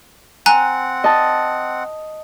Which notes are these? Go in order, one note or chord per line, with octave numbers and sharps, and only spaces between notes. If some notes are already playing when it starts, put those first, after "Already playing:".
C4 F#5 G#5 A#5 F#6
D#5 A5